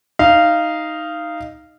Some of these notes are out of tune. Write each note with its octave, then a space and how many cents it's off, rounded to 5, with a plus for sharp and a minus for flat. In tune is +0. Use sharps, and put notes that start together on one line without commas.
D#4 +0 F5 -15